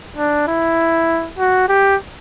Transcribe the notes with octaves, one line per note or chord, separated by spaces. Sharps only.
D4
E4
F#4
G4